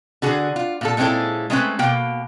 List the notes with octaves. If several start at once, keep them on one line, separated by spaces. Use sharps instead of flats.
D3 F#4 G#4
F4
A#2 F4 A4
A#2 G#3 C4 C#4 E4 A4
G#3 A3 C4 C#4 B4
B2 A#3 G5